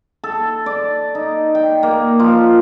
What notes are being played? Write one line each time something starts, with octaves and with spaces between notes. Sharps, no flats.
A4
D5
D#4
G5
A#3
F3